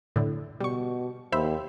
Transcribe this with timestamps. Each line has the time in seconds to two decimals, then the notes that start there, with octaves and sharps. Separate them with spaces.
0.16 A2 D3
0.60 B2 G3 C#6
1.32 D#2 C5 E5 B5